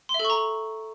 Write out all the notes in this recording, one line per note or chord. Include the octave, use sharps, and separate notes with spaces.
C6
E5
A4
C#6
A#5